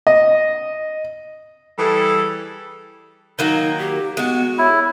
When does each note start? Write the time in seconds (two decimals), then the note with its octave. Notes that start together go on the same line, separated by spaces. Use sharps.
0.07 D#5
1.79 E3 G3 G#4 A4
3.39 D#3 F#3 A#3 D#4
3.79 G4
4.17 G#3 B3 F#4
4.58 E4 C#5